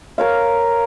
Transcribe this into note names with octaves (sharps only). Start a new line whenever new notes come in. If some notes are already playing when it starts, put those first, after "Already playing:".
A#4 C#5 F5